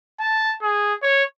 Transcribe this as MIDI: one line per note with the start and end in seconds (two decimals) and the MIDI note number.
0.20 0.55 81
0.62 0.94 68
1.03 1.24 73